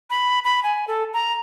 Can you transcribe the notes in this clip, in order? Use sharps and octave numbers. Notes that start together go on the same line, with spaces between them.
B5
B5
G#5
A4
A#5